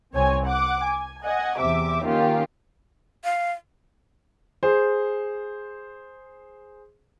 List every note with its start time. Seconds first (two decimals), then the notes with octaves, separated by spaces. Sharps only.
0.14 C2 C4 C#5 G#5
0.45 F#5 D6
0.85 G#5
1.24 D#5 F#5 G#5
1.59 E2 C3 E5 D6
2.05 D#3 A#3 C#4 F4 G4
3.24 F5
4.63 G#4 C5